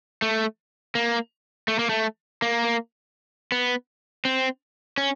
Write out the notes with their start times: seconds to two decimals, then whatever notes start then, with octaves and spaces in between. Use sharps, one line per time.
0.22 A3
0.95 A#3
1.68 A3
1.79 A#3
1.89 A3
2.42 A#3
3.52 B3
4.25 C4
4.98 C#4